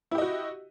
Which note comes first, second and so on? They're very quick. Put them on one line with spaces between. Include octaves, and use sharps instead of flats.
E4 G4 D#5 F#4